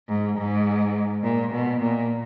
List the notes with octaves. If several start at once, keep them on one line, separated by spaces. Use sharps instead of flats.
G#2
G#2
A#2
B2
A#2